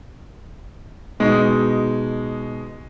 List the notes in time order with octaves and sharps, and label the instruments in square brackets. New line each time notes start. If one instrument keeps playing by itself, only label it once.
[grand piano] B2 G#3 D#4